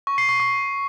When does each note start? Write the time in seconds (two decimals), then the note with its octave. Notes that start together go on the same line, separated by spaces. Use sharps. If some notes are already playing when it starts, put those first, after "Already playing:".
0.07 C#6
0.18 C7
0.29 C#6
0.40 C#6